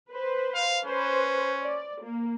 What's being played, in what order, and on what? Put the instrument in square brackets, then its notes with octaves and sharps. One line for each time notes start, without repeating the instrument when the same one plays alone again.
[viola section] B4 C5
[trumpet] F5
[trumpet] C#4 [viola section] B4 C5
[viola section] D5
A#3